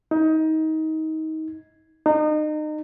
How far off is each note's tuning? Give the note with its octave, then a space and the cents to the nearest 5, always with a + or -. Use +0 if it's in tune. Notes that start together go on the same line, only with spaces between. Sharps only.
D#4 +25
D#4 -30